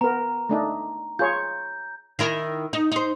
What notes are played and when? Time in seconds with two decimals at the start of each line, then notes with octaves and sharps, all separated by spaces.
0.01 B3 A#4 A#5
0.49 A3 D4 D#4
1.19 F4 G#4 C#5 G6
2.19 D#3 E4 A#4
2.73 D#4
2.92 D#4 C5